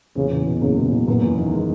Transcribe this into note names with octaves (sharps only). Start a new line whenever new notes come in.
E2 C#3
E2
B2
F#1 C#3
B2
F#1
F#1 B3
E2
D#3
G#3